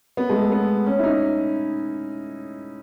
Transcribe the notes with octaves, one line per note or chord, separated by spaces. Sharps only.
B3
G#3
A3
B3
C#4
E4
D#4